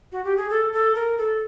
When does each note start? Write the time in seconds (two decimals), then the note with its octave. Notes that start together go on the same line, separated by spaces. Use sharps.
0.12 F#4
0.24 G4
0.37 G#4
0.50 A4
0.73 A4
0.95 A#4
1.18 A4